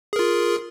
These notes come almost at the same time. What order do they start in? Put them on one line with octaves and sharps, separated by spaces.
G#4 A#4 F4